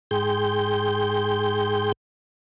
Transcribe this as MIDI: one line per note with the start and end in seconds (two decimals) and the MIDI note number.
0.11 1.92 44
0.11 1.92 68
0.11 1.92 79
0.11 1.92 84
0.11 1.92 91